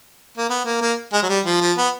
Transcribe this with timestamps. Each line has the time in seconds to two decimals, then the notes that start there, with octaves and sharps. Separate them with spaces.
0.38 A#3
0.50 B3
0.66 A#3
0.81 A#3
1.13 G#3
1.22 F#3
1.29 G3
1.46 F3
1.61 F3
1.78 B3